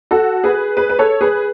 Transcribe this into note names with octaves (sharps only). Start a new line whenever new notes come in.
F#4 A4
G#4 B4
G#4 B4
B4
A4 C#5
G#4 B4